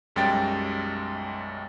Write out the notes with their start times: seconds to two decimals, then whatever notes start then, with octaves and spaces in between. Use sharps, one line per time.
0.16 B1 F#2 G3 G#3 G5 A6